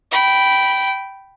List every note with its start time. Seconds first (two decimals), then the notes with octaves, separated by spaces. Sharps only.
0.12 G5 B5